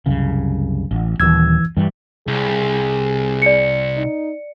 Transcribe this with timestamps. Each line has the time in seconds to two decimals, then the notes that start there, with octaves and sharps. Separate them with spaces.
0.06 C2 F#2 C#3
0.91 A1
1.20 D#1 D#2 E3 E6 G#6
1.77 G2 E3 G3
2.27 C2 G#4
3.42 D5 C#7
3.97 D#4